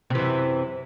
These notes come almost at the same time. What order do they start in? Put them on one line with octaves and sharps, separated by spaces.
C3 E3 F#2